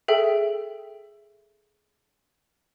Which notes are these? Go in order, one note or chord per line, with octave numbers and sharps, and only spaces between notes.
G#4 A4 E5 G5